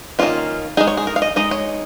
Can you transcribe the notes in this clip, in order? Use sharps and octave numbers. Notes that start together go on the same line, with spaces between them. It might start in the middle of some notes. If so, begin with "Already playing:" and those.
D#3 A#3 C#4 F4
G#3 D#4 G#4
C#5
G#4
A#4
F5
D#5
G#3 D#4 D#5
C#5